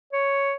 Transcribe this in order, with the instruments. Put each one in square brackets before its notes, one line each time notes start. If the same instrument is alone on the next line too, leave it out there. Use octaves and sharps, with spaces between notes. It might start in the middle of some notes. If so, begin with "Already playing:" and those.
[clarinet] C#5